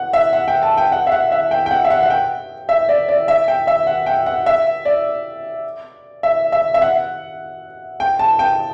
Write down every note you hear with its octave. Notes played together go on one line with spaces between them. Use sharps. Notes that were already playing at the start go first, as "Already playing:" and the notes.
Already playing: F#5
E5
F#5
G5
A5
G5
F#5
E5
F#5
E5
G5
G5
F#5
E5
F#5
F#5
G5
E5
D5
D5
E5
G5
E5
F#5
G5
F#5
E5
D5
E5
E5
E5
F#5
G5
A5
G5